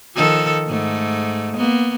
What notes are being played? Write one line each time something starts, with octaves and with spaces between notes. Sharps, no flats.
D#3 F3 A4
G#2 A3
A#3 B3